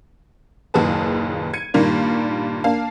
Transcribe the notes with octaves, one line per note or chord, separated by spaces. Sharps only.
F#1 D#2 A#2 G#4 B4 A5
G#6 C#7 D#7
G2 A#2 D#3 G3 A#3
A#3 D4 F5 A5